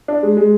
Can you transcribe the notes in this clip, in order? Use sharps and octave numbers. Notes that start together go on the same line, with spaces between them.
D4
G#3
G#3